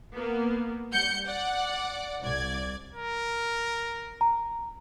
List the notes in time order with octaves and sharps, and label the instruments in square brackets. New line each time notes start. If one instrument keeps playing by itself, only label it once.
[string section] A#3 B3
G3 F#5 G6 C#7
D5 F#5
C2 D5 G#6
[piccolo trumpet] A#4
[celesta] A#5